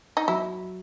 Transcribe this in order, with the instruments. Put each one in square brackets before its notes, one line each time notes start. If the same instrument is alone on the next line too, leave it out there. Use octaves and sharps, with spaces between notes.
[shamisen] D#4
[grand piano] F#3 [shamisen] E4